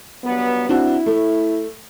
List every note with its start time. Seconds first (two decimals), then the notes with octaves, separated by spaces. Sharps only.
0.24 G2 F#3 B3
0.69 C4 D4 E4 F#4
1.06 A3